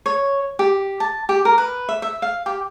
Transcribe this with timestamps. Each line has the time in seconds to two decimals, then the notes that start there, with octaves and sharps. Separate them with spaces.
0.06 C#5
0.59 G4
1.00 A5
1.29 G4
1.45 A#4
1.58 B4
1.89 E5
2.02 E5
2.22 F5
2.46 G4